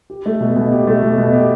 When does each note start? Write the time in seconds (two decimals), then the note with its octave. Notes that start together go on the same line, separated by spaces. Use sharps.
0.10 G4
0.26 A3
0.41 B2
0.56 B2
0.72 G4
0.87 A3
1.03 B2
1.18 B2
1.33 G4